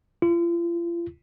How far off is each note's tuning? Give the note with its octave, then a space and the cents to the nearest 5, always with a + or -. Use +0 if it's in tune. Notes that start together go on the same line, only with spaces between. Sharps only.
F4 -40